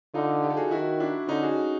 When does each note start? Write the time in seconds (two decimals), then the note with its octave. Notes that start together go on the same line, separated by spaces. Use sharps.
0.14 D3 D#4 F4
0.43 F4 G4
0.50 A4
0.57 F#4 G#4
0.71 D#3 E4 F#4
1.00 D4 E4
1.28 D3 C#4 D#4
1.43 F#4 G#4